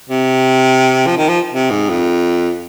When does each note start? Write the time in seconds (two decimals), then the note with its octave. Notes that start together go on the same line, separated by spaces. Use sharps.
0.10 C3
1.07 F3
1.17 D#3
1.29 F3
1.53 C3
1.70 G#2
1.89 F2